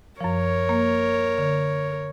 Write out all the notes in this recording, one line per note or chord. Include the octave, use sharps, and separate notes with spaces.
F#2 F3 A#4 C#5
A#3
D3